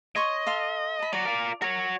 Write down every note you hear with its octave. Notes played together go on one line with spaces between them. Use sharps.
C#5 D#5 C6 C#6
A4 F5 C6
A5 B5
F#3 F#4 D5
F4 A#4
F#4 A#4 C#5